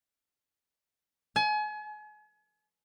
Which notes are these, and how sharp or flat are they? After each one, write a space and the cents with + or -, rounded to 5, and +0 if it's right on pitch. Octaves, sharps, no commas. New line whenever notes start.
G#5 +35